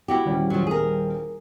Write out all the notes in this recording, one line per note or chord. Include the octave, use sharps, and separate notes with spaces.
E4 F#4 G4
D#1 G3 C#4
F3 F#3
G#4 A#4